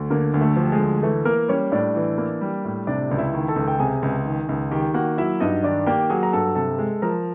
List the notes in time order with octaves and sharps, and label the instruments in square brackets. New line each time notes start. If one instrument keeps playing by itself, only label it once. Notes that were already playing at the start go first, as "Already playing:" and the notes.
Already playing: [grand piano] D2
D3 A#3 A#4
D2
A3 A4
F3
G4
G#3 G#4
D2
E3 A3 A4
A#3 A#4
G3 C#4 C#5
A2 D4 D5
E3
A#3
G3
A2
C3 D4 D5
C#2
E4 E5
D#3
A4 A5
C#2
G5
C3 G#4 G#5
C#2
D#3
C#2
D#3 G4 G5
A#3 F#4 F#5
F#3 E4 E5
G2 D#4 D#5
D#3 D4 D5
A#3 G4 G5
F#3 G#4 G#5
A#5
G2 A4 A5
C3 A4 A5
G#3
F3 A#4 A#5